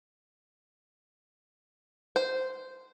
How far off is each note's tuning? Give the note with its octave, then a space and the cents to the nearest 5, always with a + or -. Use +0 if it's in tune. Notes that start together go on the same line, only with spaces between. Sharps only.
C5 -10